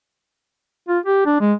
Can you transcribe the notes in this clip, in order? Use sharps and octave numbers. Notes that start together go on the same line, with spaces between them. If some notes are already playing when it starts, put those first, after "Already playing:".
F4
G4
D4
G#3